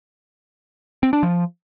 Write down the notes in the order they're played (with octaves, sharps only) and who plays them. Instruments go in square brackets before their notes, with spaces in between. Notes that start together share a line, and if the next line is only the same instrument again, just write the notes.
[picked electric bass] C4
D4
F3